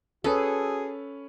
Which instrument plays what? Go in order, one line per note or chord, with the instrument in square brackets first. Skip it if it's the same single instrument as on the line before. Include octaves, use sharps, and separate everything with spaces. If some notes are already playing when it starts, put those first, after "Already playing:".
[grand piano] C#4 B4 C#5 [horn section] F#4 G#4 [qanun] A4